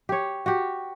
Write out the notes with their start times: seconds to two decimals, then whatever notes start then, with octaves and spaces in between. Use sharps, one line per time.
0.09 G4 C#5
0.46 F#4 G4